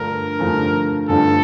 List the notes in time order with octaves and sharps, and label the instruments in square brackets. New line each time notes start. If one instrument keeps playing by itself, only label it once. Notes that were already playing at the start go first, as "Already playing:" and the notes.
Already playing: [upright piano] G2 D3 F3 A3 [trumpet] A#4
[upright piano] G2 D3 F3 A3
[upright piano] G2 D3 F3 A3 [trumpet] A4